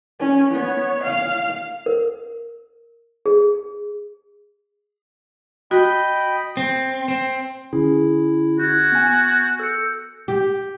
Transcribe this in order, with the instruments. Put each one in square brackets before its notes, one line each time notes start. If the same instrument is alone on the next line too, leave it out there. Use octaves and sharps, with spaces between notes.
[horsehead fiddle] C#4
B3 C#5
F5
[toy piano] A#4
G#4
[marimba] F#4 [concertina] D#5 G5 B5
[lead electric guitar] C4
C4
[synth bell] D3 C#4 G#4 [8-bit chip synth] E4
[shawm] F#4 [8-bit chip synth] G6 G#6
[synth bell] B3 G#5
[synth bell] A4 [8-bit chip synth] E6 G6 C#7
[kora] G4